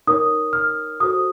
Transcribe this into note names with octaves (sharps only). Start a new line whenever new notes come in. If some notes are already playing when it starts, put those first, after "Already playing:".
D#4 A#4 C#5 D#6
F6
F#4 A4 C5 D#6